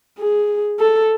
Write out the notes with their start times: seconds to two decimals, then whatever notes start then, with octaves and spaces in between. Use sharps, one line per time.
0.18 G#4
0.80 A4